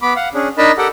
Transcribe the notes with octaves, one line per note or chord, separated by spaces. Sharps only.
B3 B5 D6
F5 F#5
C#4 D4 G#4
D4 D#4 A#4 D#5 A5 B5
G4 A4 A#4 F#5 G5